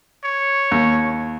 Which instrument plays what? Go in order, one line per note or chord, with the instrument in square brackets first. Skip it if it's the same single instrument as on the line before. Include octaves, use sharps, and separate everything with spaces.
[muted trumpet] C#5
[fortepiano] D#2